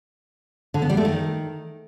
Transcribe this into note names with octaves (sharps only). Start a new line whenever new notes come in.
D3
B3
G3
A3
D#3